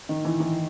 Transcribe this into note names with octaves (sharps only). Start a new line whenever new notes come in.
D#3
E3
E3